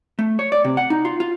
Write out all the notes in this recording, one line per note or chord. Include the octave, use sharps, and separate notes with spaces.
A3
C#5
D5
C3
F#5
D#4
F4
F4